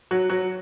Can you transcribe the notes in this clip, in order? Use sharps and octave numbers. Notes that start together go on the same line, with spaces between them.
F#3 F#4
F#3 F#4